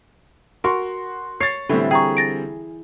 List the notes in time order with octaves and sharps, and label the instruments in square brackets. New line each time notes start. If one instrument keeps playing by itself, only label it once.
[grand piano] F#4 C6 C#6 [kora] A#4
[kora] C#5 [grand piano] A6 C7
[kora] A2 E3 [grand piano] D3 G3 C4
[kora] G#4 [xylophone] G5 A#5 C#6
[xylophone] A6 A#6 D7